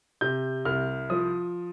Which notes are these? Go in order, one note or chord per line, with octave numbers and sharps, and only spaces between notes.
C3 G6
C2 F6
F3 D#6